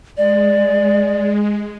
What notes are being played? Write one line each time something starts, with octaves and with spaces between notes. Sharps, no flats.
G#3 D5